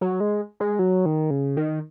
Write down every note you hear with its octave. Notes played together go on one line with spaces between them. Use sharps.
F#3
G#3
G#3
F#3
D#3
C#3
D#3